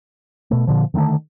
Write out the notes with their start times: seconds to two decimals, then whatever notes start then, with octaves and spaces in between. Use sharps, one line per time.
0.51 B2 A3
0.67 A#2 D3 F3
0.94 D3 D#3 G3 A3